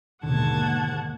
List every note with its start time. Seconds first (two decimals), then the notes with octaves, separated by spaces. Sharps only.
0.23 D#2 G#2 B2 D3 F#5 A5 G#6